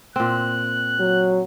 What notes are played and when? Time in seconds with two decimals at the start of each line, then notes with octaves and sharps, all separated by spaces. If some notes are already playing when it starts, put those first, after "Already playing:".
0.16 A#2 C4 F#6
1.00 F#3